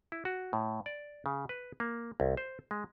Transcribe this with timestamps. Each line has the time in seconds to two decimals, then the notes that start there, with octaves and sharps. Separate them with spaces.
0.12 E4
0.25 F#4
0.53 A2
0.86 D5
1.26 C#3
1.49 B4
1.80 A#3
2.20 C2
2.37 C5
2.71 G#3